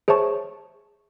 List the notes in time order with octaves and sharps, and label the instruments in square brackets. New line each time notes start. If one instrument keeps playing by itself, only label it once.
[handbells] G#4 C5 C#5 E5 A5 C#6